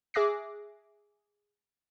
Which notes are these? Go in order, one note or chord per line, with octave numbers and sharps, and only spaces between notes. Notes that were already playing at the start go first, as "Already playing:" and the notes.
G#4 E5 D6 F#6 A#6 C7